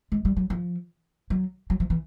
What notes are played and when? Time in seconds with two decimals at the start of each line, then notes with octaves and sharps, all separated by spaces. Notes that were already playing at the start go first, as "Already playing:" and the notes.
0.12 G#3
0.25 G3
0.37 F#3
0.50 F3
1.30 F#3
1.70 F#3
1.80 F3
1.90 E3